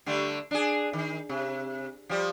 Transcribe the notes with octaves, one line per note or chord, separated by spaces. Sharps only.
D3 G3 A3
D4 G#4
D#3
C3
F3 G3